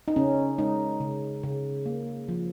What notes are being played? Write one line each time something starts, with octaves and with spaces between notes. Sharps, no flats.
D#4
C#3 C#4
G#3 D#4
C#3
C#3
A#3
F3